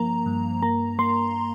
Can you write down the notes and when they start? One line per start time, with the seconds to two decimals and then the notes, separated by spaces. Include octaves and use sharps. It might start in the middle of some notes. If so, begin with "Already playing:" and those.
Already playing: G2 F3 A#3 A#5
0.26 G2
0.62 A#3 A#5
0.99 A#3 C6